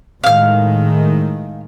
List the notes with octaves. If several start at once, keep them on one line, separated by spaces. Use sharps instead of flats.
A2 D#3 G#3 F5 F6